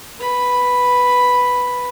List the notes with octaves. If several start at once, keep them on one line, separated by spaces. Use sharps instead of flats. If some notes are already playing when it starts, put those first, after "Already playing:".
B4 B5